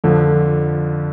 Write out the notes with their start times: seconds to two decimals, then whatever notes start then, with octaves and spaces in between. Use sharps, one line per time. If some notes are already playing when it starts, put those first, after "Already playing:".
0.04 F2 D3 F3